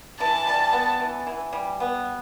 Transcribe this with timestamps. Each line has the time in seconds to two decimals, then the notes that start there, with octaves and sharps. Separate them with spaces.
0.20 E3 A5
0.47 G3
0.73 B3
1.00 E3
1.27 E3
1.53 G3
1.80 B3